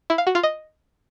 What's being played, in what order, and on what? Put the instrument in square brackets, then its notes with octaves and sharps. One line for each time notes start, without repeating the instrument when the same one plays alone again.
[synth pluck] E4
F5
F#4
F4
D#5